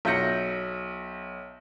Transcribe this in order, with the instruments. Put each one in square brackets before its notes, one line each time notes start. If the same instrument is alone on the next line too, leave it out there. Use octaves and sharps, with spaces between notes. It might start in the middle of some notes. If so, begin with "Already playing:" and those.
[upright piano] B1 E5 G6 A#6 C#7